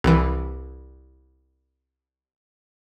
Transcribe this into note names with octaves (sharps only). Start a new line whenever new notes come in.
C2 E3